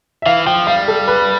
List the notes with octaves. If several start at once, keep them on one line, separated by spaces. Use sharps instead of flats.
E5
E3 F5
F3 G5
G3 F5
A4
B4